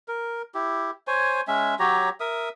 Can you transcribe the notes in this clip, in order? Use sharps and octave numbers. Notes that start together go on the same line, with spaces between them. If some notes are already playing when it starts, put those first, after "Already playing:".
A#4
E4 G4
C5 C#5 G#5
G#3 C#4 E5
F#3 G4 C#5 A#5
A#4 E5 D#6